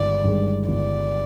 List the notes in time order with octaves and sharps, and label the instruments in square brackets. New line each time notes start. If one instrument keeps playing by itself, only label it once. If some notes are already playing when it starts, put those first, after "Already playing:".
Already playing: [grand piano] G1 G2 D#3 G#3 [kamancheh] D5
[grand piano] G2 D#3 G#3
[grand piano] G1 [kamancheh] D5